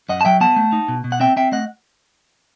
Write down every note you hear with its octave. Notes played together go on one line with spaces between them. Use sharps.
F#2 D#5 F#5
A5
F#3 E5 G5
B3 F#5 A5
A3
D#4
B2
B2
F#5
C4 E5 G5
C4 E5 G5
A3 D#5 F#5